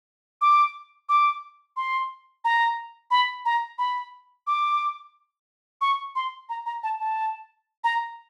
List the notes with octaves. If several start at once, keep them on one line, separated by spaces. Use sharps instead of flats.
D6
D6
C6
A#5
B5
A#5
B5
D6
C#6
C6
A#5
A#5
A5
A5
A#5